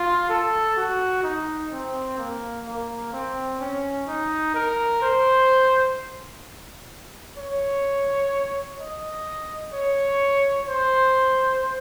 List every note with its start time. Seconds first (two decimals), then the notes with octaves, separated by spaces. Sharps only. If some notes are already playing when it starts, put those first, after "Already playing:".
Already playing: F4
0.29 A4
0.77 F#4
1.24 D#4
1.72 C4
2.18 A#3
2.66 A#3
3.13 C4
3.60 C#4
4.07 D#4
4.54 A#4
5.02 C5
7.38 C#5
8.80 D#5
9.74 C#5
10.69 C5